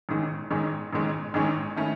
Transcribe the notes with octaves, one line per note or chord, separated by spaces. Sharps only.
A1 G#2 D#3 G#3 C#4
A1 G#2 D#3 G#3 C#4
A1 G#2 D#3 G#3 C#4
A1 G#2 D#3 G#3 C#4
D#3 A3 C#4 E4